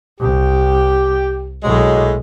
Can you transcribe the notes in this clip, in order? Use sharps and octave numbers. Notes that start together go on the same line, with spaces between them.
C2 G4
B1 A2 F#3 G#3